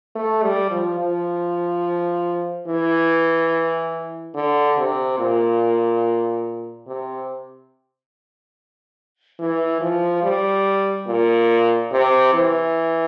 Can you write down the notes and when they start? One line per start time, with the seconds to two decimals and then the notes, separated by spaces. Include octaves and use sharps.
0.16 A3
0.43 G3
0.71 F3
1.00 F3
2.67 E3
4.35 D3
4.78 C3
5.19 A#2
6.88 C3
9.39 E3
9.81 F3
10.23 G3
11.07 A#2
11.92 C3
12.34 E3